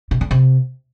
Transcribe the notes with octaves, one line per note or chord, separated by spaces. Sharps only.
B2
D3
C3